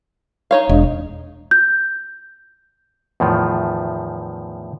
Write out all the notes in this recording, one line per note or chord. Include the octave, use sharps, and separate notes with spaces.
D#4 C#5 F5
E1 G#3 D4 D#5
G6
E2 A2 D#3 F3